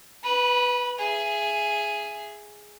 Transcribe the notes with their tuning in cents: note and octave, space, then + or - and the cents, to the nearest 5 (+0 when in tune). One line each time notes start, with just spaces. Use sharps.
B4 +0 B5 -25
G#4 +0 E5 +25